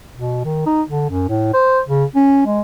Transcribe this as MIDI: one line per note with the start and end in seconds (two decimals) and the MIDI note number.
0.15 0.42 47
0.44 0.61 51
0.66 0.82 63
0.88 1.09 50
1.10 1.25 42
1.28 1.51 45
1.54 1.80 72
1.88 2.04 49
2.15 2.43 61
2.46 2.61 56